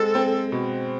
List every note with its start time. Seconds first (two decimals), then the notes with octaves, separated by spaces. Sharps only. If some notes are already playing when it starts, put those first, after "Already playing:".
Already playing: G#3 C4 A4
0.15 C4
0.52 B2